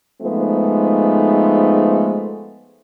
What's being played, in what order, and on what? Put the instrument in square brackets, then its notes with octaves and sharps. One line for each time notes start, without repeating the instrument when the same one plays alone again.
[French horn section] F3 G#3 A3 B3 D#4